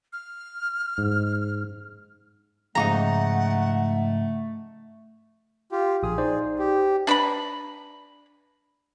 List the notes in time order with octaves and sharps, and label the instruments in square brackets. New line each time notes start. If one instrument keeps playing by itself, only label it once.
[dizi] F6
[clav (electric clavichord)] G#2
[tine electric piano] G#2 C#3 F3 [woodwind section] A3 [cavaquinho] D#4 F#4 A#5 [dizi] F#5
[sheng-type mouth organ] F4 G4
[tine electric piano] A#1 D#6 [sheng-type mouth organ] G#4
[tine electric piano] D#4 C5 D5
[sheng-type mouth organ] G4
[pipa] D4 B4 A#5 B5